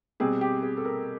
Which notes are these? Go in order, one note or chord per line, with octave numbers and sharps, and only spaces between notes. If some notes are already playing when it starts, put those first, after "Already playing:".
B2 G3 C4 G#4
G4
G#4
A4
A#4